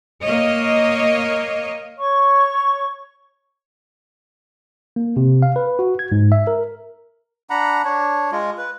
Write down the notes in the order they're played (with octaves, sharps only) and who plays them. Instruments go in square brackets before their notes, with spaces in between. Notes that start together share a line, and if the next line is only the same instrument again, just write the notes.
[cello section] A#3 C#5 D#5
[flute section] C#5 C#6
[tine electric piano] A#3
C3
F5
B4
F#4
G#6
G#2
E5
A#4
[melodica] D4 F#5 A#5 B5
D4 C#5
G#3 F4
B4